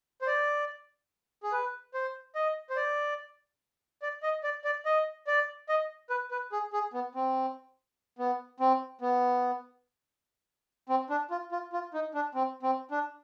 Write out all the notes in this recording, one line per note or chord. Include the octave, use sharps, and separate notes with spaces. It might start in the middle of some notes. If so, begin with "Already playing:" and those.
C5
D5
G#4
B4
C5
D#5
C5
D5
D5
D#5
D5
D5
D#5
D5
D#5
B4
B4
G#4
G#4
B3
C4
B3
C4
B3
C4
D4
F4
F4
F4
D#4
D4
C4
C4
D4